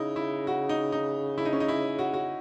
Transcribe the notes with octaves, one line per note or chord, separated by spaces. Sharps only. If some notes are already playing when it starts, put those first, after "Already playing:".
Already playing: C#3 D#4 E4
E4
F#4
D#4
D#4
E4
D#4
C#4
D#4
E4
F#4
F#4